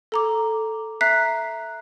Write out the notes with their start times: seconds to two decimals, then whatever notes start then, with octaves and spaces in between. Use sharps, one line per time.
0.12 A4 A#5 D6
1.01 E5 A#5 F#6 B6 C7